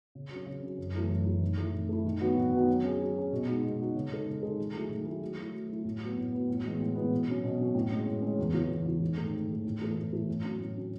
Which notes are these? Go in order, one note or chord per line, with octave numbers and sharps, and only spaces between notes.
C#3
F#3
C#4
C#3
F#3 C#4
F#2
E3 A3 E4
F#2
E3 A3 E4
D#3
A3 E4
D#3
A3 E4
D#3
F#3 B3 D#4 F#4
D#3
F#3 B3 D#4 F#4
F#3
C#4 G#4
F#3
C#4 G#4
B2
G#3 D#4 F#4
B2
G#3 D#4 F#4
C#3
G#3 D#4 A4
C#3
G#3 D#4 A4
D#3
F#3 A3 E4 G#4
D#3
F#3 A3 E4 G#4
F#3
A3 E4
F#3
A3 E4
A2
F#3 B3
A2
F#3 B3
A2
E3 G#3 B3
A2
E3 G#3 B3
B2
F#3 C#4
B2
F#3 C#4
A2
G#3 C#4
A2
G#3 C#4
E2
C#3 E3
E2
C#3 E3
G#2
D#3 A3
G#2
D#3 A3
A2
E3 A3 E4 A4
A2
E3 A3 E4 A4
A2
F#3 C#4
A2
F#3 C#4